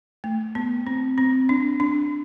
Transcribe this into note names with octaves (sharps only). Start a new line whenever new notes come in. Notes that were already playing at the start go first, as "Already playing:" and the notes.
A3
B3
C4
C4
D4
D4